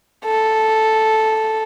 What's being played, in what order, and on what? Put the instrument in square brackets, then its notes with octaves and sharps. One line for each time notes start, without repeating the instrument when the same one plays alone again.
[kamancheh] A4